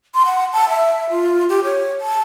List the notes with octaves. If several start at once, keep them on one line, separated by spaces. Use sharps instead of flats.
C6
F#5
A5
E5
F4
G4
C#5
A5